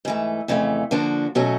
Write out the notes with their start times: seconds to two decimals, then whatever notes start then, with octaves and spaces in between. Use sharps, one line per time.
0.05 G#2 E3 A3
0.48 F2 C#3 E3 A3
0.91 D3 F3 A#3 D4 F#4
1.35 B2 F#3 A3 C#4 F#4